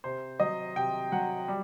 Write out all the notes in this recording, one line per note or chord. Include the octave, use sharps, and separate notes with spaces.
C3 C5
F#3 D#5
C3 G5
F#3 F#5
G3